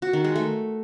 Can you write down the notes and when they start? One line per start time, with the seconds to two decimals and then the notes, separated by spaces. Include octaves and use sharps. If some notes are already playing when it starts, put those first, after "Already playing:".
0.02 F#4
0.13 D#3
0.24 G#3
0.36 A3